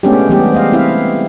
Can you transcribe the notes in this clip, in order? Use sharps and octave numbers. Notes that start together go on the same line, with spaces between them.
G#3 A3 B3 C#4 D4 G4
E3 G3 B3 G4
C5 D#5 F5
C4 E4 E5 F5